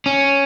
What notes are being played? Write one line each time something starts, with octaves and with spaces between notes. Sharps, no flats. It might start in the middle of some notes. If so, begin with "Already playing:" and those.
C#4